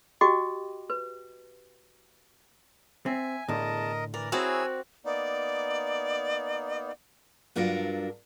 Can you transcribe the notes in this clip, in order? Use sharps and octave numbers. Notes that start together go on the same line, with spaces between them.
F#4 G4 D#5 G5 D6
B4
C4 E5 G#5
E2 A2 D3 A#4 D#5 A5
E3 A#4 D5
C4 E4 F#4 G#4 C#5 D5 G#5 E6
A#3 B3 D#4 D5
G2 F#3 D4 F4 A4 A#4